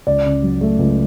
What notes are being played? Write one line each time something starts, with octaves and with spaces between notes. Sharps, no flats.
C#2 D5
C#3
F#3
A3
C#2